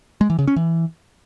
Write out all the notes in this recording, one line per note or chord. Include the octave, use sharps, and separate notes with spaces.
G#3
E3
C#3
C#4
E3